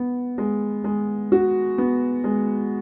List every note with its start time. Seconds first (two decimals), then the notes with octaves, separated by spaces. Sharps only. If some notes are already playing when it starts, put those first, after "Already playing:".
Already playing: B3
0.38 G#3
0.84 G#3
1.32 F#4
1.78 B3
2.24 G#3